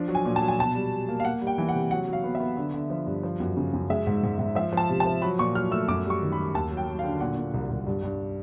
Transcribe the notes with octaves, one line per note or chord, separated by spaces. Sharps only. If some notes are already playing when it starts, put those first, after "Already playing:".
Already playing: F3 D4
F#3
G#5
A#2
A5
F#3
G#5
B2 A5
G3
G3
A#3
F5
A#3 F#5
G3
G5
E3
F#5
C3
F#3 F#5
F#3
F5
B3
E5
B3
D3
D3
F3
G2
F3
F#2
C#3
F#2
G#3 E5
G#2
G#2
G#2
F3 E5
F3 A5
C3
A5
F3
F#3 B5
A#2 C#6
F#3 F6
A3 E6
F#2 D6
G3
C#6
D#3
B5
G3
D#2 A5
F#3
G5
F#3
F5
D3
A#2 F#5
A#2
C2
C2
G2
G2